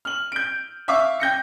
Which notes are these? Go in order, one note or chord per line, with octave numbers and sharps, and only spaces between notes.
F6 F#7
G6 D7
E5 F5 C#6 D6
G5 G6 A#6 C#7